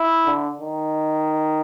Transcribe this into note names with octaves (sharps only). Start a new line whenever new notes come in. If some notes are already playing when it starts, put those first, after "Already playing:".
Already playing: E4
D3
D#3